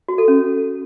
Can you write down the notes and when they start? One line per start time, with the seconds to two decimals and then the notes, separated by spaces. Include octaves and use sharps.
0.08 F#4
0.18 A4
0.28 C#4